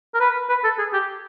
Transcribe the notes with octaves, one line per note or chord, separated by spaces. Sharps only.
A#4
B4
B4
A4
G#4
G4